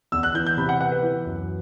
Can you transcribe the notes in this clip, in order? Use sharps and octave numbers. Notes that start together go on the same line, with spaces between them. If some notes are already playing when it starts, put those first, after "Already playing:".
E2 E6
F#6
E3 G6
G6
C3 B5
F#5
B3 F#5
B4
E3
F#2